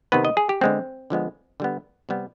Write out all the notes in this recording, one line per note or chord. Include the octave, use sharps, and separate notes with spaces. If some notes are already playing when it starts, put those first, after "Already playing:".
C3 D#3 B3 B4
D#5
G#4
G4
D3 G#3 B3 C4
D3 F3 G#3 B3
D3 G3 B3
C3 G3 B3